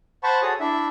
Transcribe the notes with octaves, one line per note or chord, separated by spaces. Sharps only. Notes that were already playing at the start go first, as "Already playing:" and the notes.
C5 F#5 A5 B5 C#6
F#4 G#4 A4 C#5 D#6
D4 E4 E5